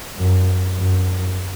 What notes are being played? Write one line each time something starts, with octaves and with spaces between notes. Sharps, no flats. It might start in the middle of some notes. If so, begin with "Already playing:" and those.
F#2
F#2